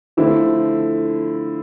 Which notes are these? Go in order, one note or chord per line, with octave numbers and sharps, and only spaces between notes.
D3 F3 A3 C4 E4